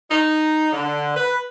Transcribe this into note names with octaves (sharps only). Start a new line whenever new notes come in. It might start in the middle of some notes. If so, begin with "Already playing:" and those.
D#4
D3
B4